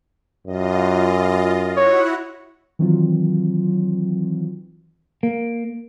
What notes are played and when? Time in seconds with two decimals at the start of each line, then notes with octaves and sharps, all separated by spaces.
0.47 F#2 F4 D#5
1.77 E4 F#4 C#5 F#5
2.79 D#3 E3 F#3 C4 F4
5.23 A#3